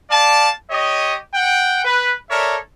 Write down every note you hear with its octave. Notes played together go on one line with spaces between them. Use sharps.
G4 D5 F5 A5
G4 C#5 D#5
F#5 G5
B4
A4 A#4 C#5 D5 E5